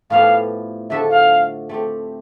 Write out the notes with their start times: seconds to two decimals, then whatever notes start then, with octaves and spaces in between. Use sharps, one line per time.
0.10 A2 F3 B3 E4 G4 F5
0.90 D3 F3 A3 D4 A4 E5
1.10 F5
1.69 A3 C4 G4